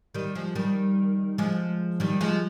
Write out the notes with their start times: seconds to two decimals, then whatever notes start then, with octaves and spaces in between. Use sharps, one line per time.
0.15 D#3 G3
0.35 F3 G#3
0.55 D#3 G3
1.38 F3 G#3
2.00 D#3 G3
2.21 F3 G#3